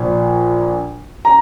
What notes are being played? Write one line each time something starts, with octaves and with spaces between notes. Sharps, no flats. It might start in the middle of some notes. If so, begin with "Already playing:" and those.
Already playing: A#1 A#2 F3
A#5